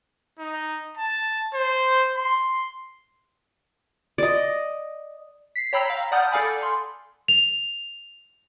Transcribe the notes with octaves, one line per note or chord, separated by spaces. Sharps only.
D#4
A5
C5
C6
D5 D#5
B6 C7
C#5 G5 A#5 B5 E6
F5
D5 F#5 A5 D#6 F6 G6
A4 D5 F5 G#5 B5
C6
F7